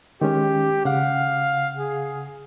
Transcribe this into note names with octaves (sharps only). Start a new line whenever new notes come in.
D#3 G#3 C#4 G4
C#3 F5 F#5
G#4